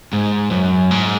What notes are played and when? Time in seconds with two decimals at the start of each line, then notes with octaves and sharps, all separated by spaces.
0.13 G#2
0.51 F#2
0.91 G#2